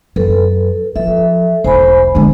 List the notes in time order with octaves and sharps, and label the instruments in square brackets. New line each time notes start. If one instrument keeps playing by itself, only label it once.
[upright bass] F#2 [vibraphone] A4 B4
[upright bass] F3 [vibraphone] A4 E5
[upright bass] E1 B1 [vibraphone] C5 G#5 B5
[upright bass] D3 G#3 [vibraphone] B3